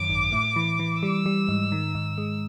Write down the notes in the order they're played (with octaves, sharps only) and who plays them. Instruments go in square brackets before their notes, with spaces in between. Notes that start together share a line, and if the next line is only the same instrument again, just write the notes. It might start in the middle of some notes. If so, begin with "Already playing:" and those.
Already playing: [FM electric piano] F#2 D#3 [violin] D6
[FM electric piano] G#1
A2
E3
E3
[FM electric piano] G3 [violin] E6
[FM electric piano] G3
G#2
D#3
G#2
G#3